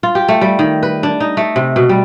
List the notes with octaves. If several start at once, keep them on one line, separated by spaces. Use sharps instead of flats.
F4
G4
A3
G3
D#3
B4
D4
D#4
A3
C3
B2
G3